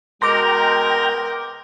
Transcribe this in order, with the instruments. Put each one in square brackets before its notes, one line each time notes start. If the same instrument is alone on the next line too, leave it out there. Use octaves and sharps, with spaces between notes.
[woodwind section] B2 G#3 [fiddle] A#4 [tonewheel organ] G5 A#5 [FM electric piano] C6 D6 A#6